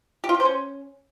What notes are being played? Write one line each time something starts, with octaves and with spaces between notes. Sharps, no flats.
G4
F4
G4
C5
C#4